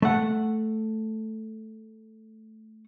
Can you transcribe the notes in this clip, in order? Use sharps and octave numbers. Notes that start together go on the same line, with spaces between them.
A3 F#5